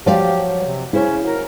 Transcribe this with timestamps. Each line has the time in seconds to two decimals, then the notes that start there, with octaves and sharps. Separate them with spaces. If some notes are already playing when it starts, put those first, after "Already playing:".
0.06 F3 F#3 G4 D5 F5
0.63 C3
0.93 C#3 C#4 E4 C5
1.24 F#3 A#4